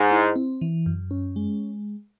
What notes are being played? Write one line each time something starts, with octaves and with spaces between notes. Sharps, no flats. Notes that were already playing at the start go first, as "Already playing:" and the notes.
Already playing: G#2
E4
C4
E3
F#2
C#4
G#3